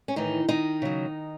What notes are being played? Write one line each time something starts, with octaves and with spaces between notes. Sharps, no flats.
C#4
A2 D#3 E3 D#4
D#3 D#4
C#3 F#3